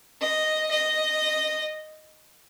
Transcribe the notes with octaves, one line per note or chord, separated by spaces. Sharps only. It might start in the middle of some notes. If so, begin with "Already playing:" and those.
D#5
D#5